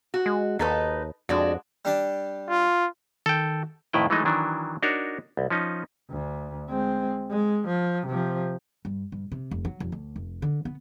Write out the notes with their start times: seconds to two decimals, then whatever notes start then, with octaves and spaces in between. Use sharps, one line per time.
0.14 F#4
0.26 G#3
0.59 D#2 D#4 A4 B4
1.29 F2 G#3 D4 F#4
1.85 G3 D4 A5
2.49 F4
3.26 D#3 A4 G5
3.93 F2 A2 D#3 E4 B4 G5
4.10 E3 F#3 G#3 A3 D#4
4.25 D#3 E3 F#3 D4
4.83 D4 D#4 F#4 A#4 C#5
5.37 C2
5.50 F3 C#4 D#4
6.10 D2
6.69 G#3 C4
7.30 G#3
7.68 F3
8.07 C3 F3
8.85 G2
9.12 G2
9.32 C3
9.51 F1
9.65 F#3
9.80 F1
9.92 D2
10.16 F1
10.42 D3
10.65 B3